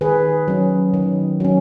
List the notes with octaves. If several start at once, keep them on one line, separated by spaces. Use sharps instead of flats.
D#3 G#4 B4
F#3 C#4
D#3
F#3 C#4